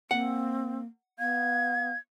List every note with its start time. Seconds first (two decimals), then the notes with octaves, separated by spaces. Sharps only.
0.11 A#3 C4 F#5
1.19 B3 F5 G#6